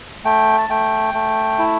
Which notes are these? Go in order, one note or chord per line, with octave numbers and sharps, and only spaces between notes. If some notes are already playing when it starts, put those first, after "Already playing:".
A3 G5
A5
A3 G5
A3
E4